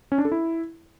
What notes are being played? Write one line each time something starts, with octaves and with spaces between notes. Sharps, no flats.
C#4
D4
A4
E4